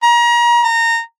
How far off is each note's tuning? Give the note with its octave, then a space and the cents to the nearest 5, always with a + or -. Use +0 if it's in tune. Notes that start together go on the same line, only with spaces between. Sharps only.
A#5 +35
A#5 -20